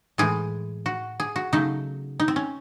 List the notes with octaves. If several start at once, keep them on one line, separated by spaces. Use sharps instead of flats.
A2 E3 G#3 G#4
F#4
G#4
F#4
C#3 F#3 A3 D#4
D#4
C4
C#4